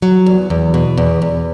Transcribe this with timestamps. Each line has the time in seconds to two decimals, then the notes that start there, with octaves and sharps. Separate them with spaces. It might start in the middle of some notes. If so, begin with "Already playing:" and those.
0.02 F#3
0.26 E2
0.50 E2
0.74 B2
0.98 E2
1.22 E2